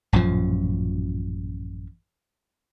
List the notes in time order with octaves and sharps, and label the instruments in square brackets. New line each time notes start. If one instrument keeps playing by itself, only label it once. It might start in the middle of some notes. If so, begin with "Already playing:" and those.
[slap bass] A1 F#2 A#2 F3